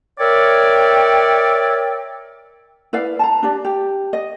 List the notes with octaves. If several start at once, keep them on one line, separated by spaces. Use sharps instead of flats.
A#4 C#5 D5 E5 G5
E4 B4 D5 F5
A5 A#5
D4 G4 D5
G4
D#5